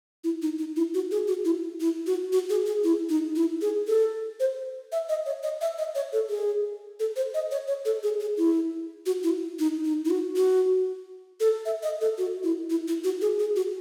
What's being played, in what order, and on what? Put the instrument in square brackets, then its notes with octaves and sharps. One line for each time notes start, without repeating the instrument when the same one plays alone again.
[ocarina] E4
D#4
D#4
E4
F#4
G#4
F#4
E4
E4
F#4
F#4
G#4
G#4
E4
D#4
E4
G#4
A4
C5
E5
D#5
C#5
D#5
E5
D#5
C#5
A4
G#4
A4
C5
D#5
C#5
C#5
A4
G#4
G#4
E4
F#4
E4
D#4
D#4
E4
F#4
F#4
A4
E5
D#5
A4
F#4
E4
E4
E4
F#4
G#4
G#4
F#4